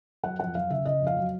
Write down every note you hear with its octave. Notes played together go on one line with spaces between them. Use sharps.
F#3 F#5
F2 F#5
F#3 F5
C#3 E5
C#3 D#5
F2
F5
F#3